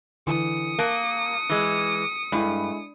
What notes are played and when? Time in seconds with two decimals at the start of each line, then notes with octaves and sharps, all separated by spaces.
0.27 D3 E3 D#6 C#7
0.79 A#3 A5 F#6 D7
1.50 E3 G#3
2.32 G2 G#3 E4 A4